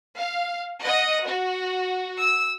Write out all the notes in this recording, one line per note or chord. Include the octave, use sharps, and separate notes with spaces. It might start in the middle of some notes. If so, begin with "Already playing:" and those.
F5
D#5 F#5
F#4
E6